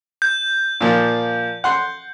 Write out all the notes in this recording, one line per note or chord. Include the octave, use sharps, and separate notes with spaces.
G6
A#2 F3
F#5 C6